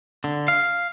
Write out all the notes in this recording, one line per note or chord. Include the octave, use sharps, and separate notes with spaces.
D3
F5